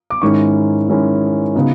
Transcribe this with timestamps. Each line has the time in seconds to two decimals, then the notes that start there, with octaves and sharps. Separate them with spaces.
0.10 D6
0.22 G#2 D#3 G#3 C#4 E4 C#6
0.88 G#2 D#3 G#3 C#4 E4
1.55 C#3 F#3 B3 D#4